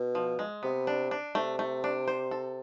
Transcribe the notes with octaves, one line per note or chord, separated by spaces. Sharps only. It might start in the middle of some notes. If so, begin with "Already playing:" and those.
Already playing: B2
F3
G#3
C3 B3
D4
D4
C3 A3
A3
D4
C5
A4